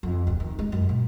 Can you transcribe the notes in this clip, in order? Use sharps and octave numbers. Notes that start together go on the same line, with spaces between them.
F2
D1
D#3
G#3
F#2
A#2